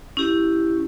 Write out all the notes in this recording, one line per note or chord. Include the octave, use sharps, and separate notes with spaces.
C#4 E4 G4